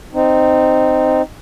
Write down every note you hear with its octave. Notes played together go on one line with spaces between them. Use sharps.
C4 D#4